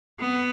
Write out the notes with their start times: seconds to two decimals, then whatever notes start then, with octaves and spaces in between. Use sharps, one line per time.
0.20 B3